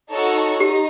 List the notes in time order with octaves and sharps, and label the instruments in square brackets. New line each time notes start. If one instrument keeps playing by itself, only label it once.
[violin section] D#4 F#4 A4 C#5
[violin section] D#4 [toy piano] G4